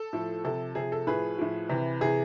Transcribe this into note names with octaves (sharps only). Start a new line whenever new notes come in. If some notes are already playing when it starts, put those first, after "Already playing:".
Already playing: A4
A2 F3
C3 F3 A4
C3 F3 G#4
A4
A2 F3 G#4 B4
A2 F3
C3 E3
C3 E3 G#4